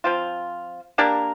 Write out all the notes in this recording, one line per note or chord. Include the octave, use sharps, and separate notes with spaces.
F3 C4 F4
A#3 D4 G4 A#4